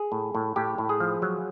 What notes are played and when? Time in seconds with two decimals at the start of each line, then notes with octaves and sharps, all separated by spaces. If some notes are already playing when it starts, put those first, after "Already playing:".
Already playing: G#4
0.12 A2
0.35 A2
0.56 A2 G4
0.78 A2
0.89 G#4
1.00 F3
1.22 F#3